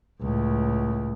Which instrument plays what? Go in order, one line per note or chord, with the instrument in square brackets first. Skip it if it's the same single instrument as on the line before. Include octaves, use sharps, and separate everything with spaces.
[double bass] C#2 A2